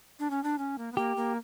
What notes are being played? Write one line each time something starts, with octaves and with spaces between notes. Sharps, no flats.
D4
C#4
D4
C#4
A#3
B3
A#3 G4
A#3